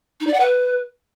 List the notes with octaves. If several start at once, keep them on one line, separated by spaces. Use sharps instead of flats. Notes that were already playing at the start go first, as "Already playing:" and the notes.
D#4
D5
F#5
B4